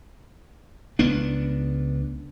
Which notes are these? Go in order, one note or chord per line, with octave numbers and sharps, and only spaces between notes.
C#2 B3 D4